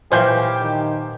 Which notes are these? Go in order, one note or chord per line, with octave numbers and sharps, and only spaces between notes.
A#2 E3 F#3 G4 C5 F5 G#5 G6
D#3